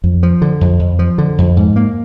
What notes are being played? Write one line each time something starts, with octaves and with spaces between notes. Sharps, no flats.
F2
F3
D3
F2
F2
F3
D3
F2
G#2
A#3